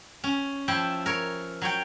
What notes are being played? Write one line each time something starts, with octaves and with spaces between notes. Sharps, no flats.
C#4
F3 E4 G5 A5
A#4 C#5
F#3 C#5 G5